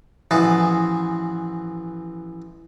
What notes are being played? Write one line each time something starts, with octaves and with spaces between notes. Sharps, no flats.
A1 E3 F3 F#4 G#4 A5